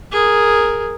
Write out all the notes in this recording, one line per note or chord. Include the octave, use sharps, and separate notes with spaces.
G#4 A#4